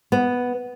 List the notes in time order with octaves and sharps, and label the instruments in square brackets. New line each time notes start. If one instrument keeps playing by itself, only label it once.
[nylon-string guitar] B3